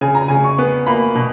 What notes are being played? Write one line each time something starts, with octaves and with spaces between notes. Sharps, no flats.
C#3 G#5
A#5
C#3 G#5
C#6
B3
A#3 B5
B2